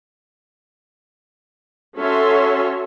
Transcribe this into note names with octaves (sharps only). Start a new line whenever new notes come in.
C#4 F#4 A4 C#5 E5 C6